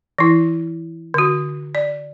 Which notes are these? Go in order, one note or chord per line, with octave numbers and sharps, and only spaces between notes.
E3 E4
D3 F#4
D5